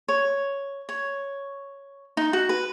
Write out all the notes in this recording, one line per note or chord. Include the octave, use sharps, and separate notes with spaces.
C#5
C#5
D#4
F#4
B4